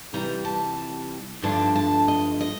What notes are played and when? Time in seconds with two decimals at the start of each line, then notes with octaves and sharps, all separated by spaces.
0.13 F2 C3 E3 G3 A#5
0.45 A5
1.42 G2 D3 F3 A3 D4 A5
1.76 A5
2.08 D#5
2.41 D#5